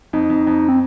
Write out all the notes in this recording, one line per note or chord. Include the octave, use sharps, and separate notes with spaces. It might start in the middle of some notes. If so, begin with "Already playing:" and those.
F2 D#4
F2
F2
C4